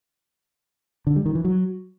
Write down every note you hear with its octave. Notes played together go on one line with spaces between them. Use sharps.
D3
G3
D#3
E3
F#3